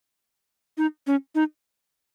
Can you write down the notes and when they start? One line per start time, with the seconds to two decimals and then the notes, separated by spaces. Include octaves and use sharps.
0.78 D#4
1.07 C#4
1.35 D#4